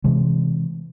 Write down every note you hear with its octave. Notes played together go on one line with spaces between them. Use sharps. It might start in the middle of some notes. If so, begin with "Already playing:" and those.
C3 E3 G#3